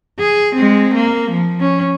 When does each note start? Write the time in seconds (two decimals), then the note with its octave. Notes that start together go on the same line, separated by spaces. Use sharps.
0.20 G#4
0.56 G#3 C4
0.94 A#3
1.31 F3
1.60 C#4